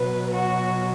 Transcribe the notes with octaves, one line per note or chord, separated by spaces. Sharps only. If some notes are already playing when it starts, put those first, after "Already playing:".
Already playing: B2 F#3 B4
F#4